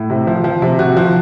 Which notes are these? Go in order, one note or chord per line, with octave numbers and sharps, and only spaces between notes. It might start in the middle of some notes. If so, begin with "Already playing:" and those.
Already playing: A2
C3
F3
F3
C3
C3 F#4
F3